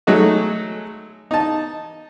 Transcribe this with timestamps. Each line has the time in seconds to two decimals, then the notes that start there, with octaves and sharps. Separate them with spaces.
0.07 F#3 G#3 A3 D#4 F#4
1.31 D#4 A5